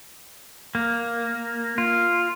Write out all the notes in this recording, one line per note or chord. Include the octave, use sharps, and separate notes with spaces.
A#3
F4